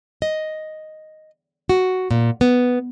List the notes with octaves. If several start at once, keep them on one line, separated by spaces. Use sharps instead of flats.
D#5
F#4
A#2
B3